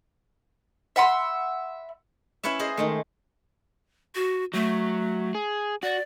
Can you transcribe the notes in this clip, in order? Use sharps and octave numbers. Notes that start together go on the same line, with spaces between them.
E5 F#5 B5 C6
C#4 E4 B4 C#5 E5
G#4 C5 D#5
D#3 G#3 A3
F#4
F#3 A3
G#4
F#4 D5